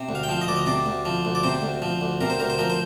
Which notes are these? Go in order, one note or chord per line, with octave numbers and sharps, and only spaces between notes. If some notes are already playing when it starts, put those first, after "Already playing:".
Already playing: C3
D2
F5
G5
F3 F5
D#5
D2 D5
D#5
C3 D5
D2
F3
D2
D5
C3 C5
D2
F3
D2
C3 A#4
C5
D2 A#4
C5
F3 A#4
C5